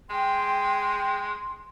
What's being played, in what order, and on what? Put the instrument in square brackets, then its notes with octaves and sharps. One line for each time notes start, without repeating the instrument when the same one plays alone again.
[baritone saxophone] G#3 [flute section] G5 [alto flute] C6